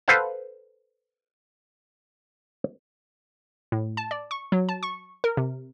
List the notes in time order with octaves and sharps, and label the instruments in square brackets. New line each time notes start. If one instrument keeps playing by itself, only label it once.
[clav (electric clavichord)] A4 B4 C5 F5 F#5 A5
[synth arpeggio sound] A2
A5
D5
C#6
F#3
A5
C#6
A#4
C3